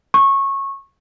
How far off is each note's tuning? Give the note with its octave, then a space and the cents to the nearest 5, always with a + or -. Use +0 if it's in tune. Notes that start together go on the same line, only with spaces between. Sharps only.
C#6 -20